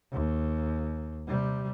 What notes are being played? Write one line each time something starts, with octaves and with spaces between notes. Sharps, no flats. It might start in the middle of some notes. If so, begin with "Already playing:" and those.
D#2
C3 G3